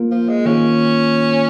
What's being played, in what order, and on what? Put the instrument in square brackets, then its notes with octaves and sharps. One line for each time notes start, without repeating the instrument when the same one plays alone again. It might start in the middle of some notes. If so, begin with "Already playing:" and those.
Already playing: [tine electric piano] A#3 F4 A#4
[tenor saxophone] F3
G#3
[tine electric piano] D#3 A#3 F4 [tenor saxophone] C#4